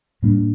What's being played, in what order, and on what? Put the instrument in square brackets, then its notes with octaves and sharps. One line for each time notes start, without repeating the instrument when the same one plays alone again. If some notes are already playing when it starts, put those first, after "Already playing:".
[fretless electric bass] A2 G3 A#3 D4